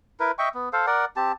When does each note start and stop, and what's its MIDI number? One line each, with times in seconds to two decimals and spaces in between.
0.20 0.31 64
0.20 0.31 70
0.20 0.31 71
0.38 0.49 75
0.38 0.49 76
0.38 0.49 79
0.38 0.49 85
0.54 0.69 59
0.73 0.86 69
0.73 0.86 72
0.73 0.86 77
0.87 1.05 70
0.87 1.05 74
0.87 1.05 78
1.16 1.32 60
1.16 1.32 67
1.16 1.32 81